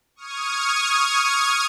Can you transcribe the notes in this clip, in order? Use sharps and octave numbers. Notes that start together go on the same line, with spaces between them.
C#6 D#6 F6 G#6